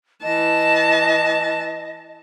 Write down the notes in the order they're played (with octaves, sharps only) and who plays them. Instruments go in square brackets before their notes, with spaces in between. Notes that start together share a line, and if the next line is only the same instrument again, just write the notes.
[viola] E3 A5 [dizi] D#5